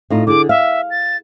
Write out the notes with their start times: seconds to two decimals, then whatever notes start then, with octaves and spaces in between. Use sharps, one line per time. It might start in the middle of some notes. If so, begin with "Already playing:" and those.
0.10 A2 D#4 F4
0.27 D3 G#4 D6
0.49 E5 F5
0.90 A6